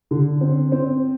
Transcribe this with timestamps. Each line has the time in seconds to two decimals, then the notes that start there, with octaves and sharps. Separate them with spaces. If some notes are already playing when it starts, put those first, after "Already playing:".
0.11 D3
0.41 C4
0.72 C4